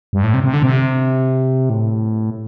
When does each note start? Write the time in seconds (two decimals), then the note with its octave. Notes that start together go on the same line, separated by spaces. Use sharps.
0.13 G2
0.23 A2
0.34 C3
0.44 C3
0.53 D3
0.63 C3
1.70 A2